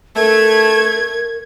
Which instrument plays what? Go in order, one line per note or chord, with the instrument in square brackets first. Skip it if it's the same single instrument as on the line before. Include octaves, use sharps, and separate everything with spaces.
[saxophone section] A3 [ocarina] A#4 [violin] G#6